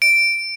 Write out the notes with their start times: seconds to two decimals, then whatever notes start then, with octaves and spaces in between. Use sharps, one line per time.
0.02 D7